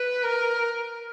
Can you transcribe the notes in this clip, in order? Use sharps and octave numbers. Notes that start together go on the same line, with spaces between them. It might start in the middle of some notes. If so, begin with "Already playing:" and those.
Already playing: B4
A#4